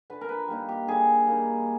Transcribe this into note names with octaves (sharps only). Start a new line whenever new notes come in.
D3 B4
A#4
B4
G3 A#3 D#4
G4
D3 G#4
G3 A#3 D#4